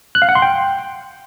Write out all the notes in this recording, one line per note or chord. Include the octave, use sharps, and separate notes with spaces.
F#6
F5
F#5
C6
G5